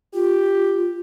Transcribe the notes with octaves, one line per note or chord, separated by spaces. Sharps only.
F4 G4